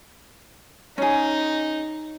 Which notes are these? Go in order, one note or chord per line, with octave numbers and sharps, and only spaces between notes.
C#4 D#4 G#4